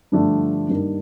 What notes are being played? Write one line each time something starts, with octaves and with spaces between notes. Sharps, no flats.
G2 D3 F3 A3 D4
G2 D#3 A#3